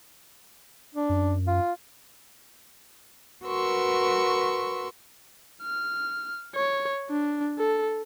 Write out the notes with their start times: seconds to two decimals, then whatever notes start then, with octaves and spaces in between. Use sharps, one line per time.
0.94 D4
1.09 F#2
1.47 F4
3.44 F#4 A#4 B4 C6 C#6 E6
5.63 F6
6.55 C#5
7.10 D4
7.59 A4